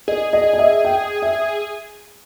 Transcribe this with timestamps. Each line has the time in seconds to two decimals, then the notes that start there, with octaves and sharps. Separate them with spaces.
0.08 G#4 D#5
0.33 D#5
0.53 D#5
0.59 E5
0.85 G5
1.22 E5